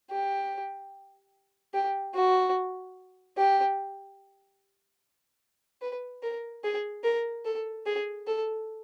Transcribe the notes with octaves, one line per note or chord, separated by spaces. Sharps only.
G4
G4
F#4
G4
B4
A#4
G#4
A#4
A4
G#4
A4